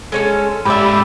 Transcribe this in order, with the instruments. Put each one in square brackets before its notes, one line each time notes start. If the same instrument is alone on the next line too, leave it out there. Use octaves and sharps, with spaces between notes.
[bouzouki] G#3 C#4 A4
[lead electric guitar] G#2 D5 [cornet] G4 [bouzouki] A4 E5 [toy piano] B5